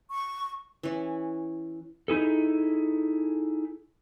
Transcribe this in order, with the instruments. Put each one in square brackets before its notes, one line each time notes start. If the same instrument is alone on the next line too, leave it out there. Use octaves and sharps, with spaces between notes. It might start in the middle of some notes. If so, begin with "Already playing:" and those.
[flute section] C#6
[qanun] E3 C#4
[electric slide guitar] D#4 E4 G#4 A4